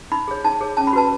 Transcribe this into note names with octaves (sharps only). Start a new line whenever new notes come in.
D#4 B5
G#4 C#5
D#4 A5
G#4 C#5
C#4 A5
B5
F#4 B4 A5